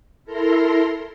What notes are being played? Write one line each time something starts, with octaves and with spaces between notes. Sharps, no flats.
E4 A4 A#4 A#5 C6